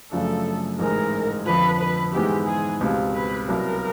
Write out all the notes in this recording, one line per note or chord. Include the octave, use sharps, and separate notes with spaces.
F#2 C#3 F3 A3 D4 A4
A1 G#2 E3 G#3 A#4
F2 D3 F3 B4
B4
G#2 E3 G#3 B3 D#4 G4
G#4
C#2 B2 G3 C4
B4
C2 B2 F#3 A#4